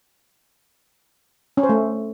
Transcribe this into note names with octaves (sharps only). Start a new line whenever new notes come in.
C#4
C5
A3